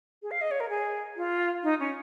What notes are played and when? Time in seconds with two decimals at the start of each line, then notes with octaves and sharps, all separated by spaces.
0.23 G#4
0.31 F5
0.41 D#5
0.51 C#5
0.60 A#4
0.69 G#4
1.17 F4
1.63 D#4
1.80 C#4